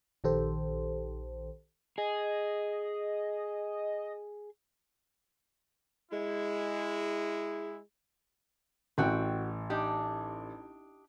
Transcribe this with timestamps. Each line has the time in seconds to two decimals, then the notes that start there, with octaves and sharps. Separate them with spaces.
0.24 A#1 D#3 G4 A4 C5
1.98 G#4 D#5
6.12 G#3 E4
8.98 A1 C4 F#4 G5
9.70 D4 D#4 G4